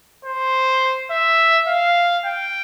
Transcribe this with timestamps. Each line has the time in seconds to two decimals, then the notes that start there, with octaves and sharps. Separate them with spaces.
0.25 C5
1.11 E5
1.68 F5
2.26 G5